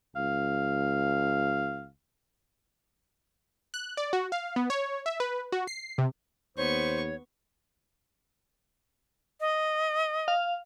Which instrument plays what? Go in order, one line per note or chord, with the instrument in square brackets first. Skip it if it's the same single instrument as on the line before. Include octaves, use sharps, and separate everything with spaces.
[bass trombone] C#2 [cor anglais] F5
[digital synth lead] F#6
D5
F#4
F5
B3
C#5
E5
B4
F#4
C7
C3
[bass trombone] D#2 [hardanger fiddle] B3 C#6 [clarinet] C5 [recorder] C#5
[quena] D#5
[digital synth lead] F5